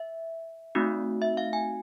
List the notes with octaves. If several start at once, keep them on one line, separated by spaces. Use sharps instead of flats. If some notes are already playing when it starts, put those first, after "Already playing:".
Already playing: E5
A3 C4 D#4 F#4
E5
F5
G#5